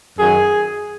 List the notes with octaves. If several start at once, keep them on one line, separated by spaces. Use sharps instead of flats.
F#2 D#3 F#3 G#4